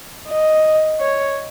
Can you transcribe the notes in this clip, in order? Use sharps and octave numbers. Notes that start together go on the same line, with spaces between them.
D#5
C#5